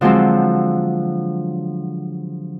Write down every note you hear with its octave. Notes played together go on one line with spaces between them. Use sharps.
D3 F3 F#3 G#3 C4